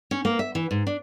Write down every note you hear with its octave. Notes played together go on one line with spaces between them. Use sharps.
C#4
A#3
E5
E3
G#2
D4